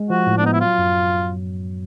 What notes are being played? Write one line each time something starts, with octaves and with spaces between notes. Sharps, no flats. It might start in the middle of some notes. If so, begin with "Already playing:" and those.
Already playing: G#3
F3 F#4
A2
D4
B3 D#4
E4
F#3 F4
F#2